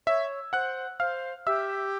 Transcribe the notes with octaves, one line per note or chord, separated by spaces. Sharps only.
C#5 E5 E6
C5 F#5 F#6
C5 F5 F6
G4 E5 E6